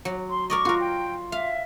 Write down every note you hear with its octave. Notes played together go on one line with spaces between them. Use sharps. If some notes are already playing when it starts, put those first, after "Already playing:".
F#3
C6
A#4 D5 D#5 C#6
F4 F#4 A#4
G5
E5 F5